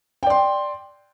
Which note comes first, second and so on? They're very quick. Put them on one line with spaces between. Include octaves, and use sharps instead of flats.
G5 D5 C6